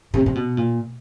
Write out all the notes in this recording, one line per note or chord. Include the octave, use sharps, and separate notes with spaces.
C3
C3
B2
A#2